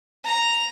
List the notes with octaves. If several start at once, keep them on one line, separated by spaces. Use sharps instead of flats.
A#5